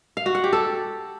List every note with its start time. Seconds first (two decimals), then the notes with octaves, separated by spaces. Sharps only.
0.17 F5
0.26 F#4
0.35 F#5
0.44 G4
0.53 A4